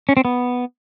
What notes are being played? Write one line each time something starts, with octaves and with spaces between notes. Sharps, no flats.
C#4
C4
B3